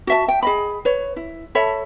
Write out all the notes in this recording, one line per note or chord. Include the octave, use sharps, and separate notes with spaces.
F#4 E5 A5
G5
G#4 D#5 B5
B4 C#5
E4
A4 C#5 E5 B5